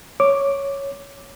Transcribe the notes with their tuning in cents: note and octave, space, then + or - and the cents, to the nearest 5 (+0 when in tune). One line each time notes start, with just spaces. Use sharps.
C#5 +0 D6 +0